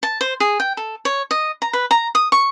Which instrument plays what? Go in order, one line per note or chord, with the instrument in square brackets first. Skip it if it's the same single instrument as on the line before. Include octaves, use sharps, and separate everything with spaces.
[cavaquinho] A5
C5
G#4
G5
A4
C#5
D#5
A#5
B4
A#5
D#6
C#6